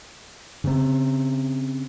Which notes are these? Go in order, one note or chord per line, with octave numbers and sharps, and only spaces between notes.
C#3 C4